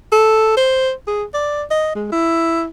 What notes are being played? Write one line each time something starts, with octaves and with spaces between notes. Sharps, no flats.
A4
C5
G#4
D5
D#5
G#3
E4